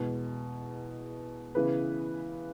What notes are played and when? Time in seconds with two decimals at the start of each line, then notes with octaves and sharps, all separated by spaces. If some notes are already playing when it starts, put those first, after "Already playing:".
Already playing: E2 B2 G#3
1.55 C#3 E3 B3 G#4 B4